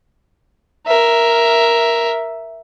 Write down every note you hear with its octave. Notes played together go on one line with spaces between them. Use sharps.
A#4 E5